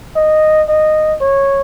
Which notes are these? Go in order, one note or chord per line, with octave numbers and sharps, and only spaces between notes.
D#5
D#5
C#5